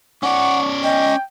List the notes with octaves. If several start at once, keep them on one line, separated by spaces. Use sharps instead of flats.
C#4 D5 F#5 C#6
D#5 G5